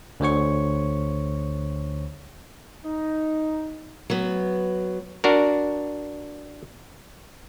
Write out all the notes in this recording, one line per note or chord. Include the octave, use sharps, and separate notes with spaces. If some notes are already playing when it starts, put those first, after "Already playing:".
D2 D3 C5 C#5 C#6
D#4
F#3 B3
D4 F#4 A#4